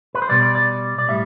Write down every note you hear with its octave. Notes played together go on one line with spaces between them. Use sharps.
B4
C5
B2 G3 D5
D5
D5
D5
A2 G3 E5